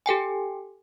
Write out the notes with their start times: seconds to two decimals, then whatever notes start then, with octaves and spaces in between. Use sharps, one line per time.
0.06 G4 A4 G5 G#5